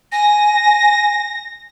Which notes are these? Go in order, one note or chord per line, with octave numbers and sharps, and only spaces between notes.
G#5 A#6